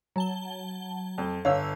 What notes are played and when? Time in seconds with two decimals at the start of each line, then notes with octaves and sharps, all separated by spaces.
0.16 F#3 A5 G7
1.18 F2
1.45 G1 C#5 F5 E6